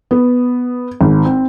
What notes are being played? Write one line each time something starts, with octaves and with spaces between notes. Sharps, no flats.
B3
G#1
C4